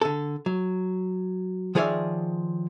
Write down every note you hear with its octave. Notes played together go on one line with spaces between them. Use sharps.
D3 A4
F#3
D#3 F3 G#4 C#5 D5 E5